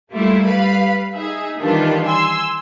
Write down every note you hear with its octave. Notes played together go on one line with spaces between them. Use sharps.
G3 A3 A#3 E4 F4
G3 B4 F5 B5
D#4 G#4 E5
D#3 E3 G3 D4 F4 B4
G#5 C6 E6